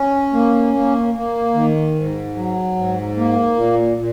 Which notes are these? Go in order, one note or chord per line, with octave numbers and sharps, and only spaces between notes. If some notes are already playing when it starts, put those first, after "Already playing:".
Already playing: C#4
A#3
A#3
A#3
D#3
G#2
F#3
G#2
A#3
A#2
A#2